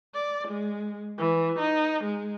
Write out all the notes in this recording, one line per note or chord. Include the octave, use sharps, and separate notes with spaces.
D5
G#3
E3
D#4
G#3